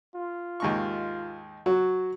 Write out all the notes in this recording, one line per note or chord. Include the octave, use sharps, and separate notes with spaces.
F4
D#2 G#2 C#6
F#3 F#4